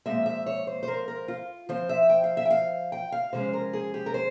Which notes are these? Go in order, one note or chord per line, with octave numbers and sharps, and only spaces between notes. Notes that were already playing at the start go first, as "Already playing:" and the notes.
A#2 F3 G#3 C4 E5
E5
C#5
C5
C5
A#4
A#4
F4
F3 C4 C5
E5
G5
F5
E5
G5
F5
G5
F5
C3 F3 G#3 C#4 C5
A#4
G#4
G4
A#4
C5